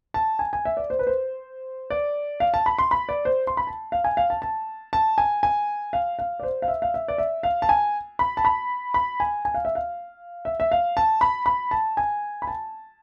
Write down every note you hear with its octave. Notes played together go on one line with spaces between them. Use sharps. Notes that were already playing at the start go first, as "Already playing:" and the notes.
A5
G#5
G#5
E5
D5
C5
B4
C5
D5
F5
A5
B5
C6
B5
D5
C5
C6
B5
A5
F5
G#5
F5
A5
A5
A5
G#5
G#5
F5
F5
D5
C5
F5
E5
F5
E5
D5
E5
F5
A5
G#5
B5
A5
B5
B5
G#5
G#5
F5
E5
F5
E5
E5
F5
A5
B5
B5
A5
G#5
B5
A5